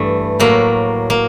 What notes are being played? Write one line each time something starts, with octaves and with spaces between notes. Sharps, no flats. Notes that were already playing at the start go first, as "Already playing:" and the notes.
Already playing: G2 E3 A3
A2 F#3 A#3
A#3